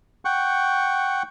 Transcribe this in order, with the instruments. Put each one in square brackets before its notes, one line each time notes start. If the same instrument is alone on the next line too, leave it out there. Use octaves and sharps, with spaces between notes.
[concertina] F#5 G5 C#6